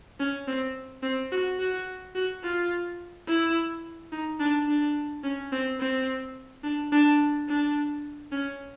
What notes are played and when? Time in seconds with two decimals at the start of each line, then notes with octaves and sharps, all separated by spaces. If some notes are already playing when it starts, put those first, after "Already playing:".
0.20 C#4
0.47 C4
1.03 C4
1.32 F#4
1.60 F#4
2.15 F#4
2.43 F4
3.27 E4
4.12 D#4
4.40 D4
4.68 D4
5.24 C#4
5.52 C4
5.80 C4
6.64 D4
6.92 D4
7.48 D4
8.32 C#4